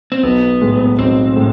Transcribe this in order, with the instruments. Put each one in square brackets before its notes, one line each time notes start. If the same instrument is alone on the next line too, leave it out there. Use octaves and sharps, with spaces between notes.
[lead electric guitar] C4
[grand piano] B1 [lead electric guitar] B3
[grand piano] A2 G#3
[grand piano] B1 [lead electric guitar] C4
[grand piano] A2 G#3